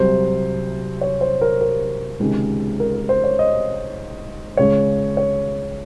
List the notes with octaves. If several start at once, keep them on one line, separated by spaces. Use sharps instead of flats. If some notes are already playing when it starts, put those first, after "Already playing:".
Already playing: C2 C3 F#3 C5
C#5
C5
A#4
A#4
C#2 C3 D#3 G#3 C#4
A#4
A#4
C5
C#5
D#5
C#2 C#3 G#3 C#5
C#5